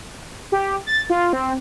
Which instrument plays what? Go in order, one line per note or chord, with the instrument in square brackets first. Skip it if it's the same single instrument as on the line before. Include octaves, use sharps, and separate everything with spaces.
[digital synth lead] G4
A6
F4
C4